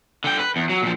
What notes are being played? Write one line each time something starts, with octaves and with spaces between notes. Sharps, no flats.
D3 G5
B4
E2
F#3
A#2 F3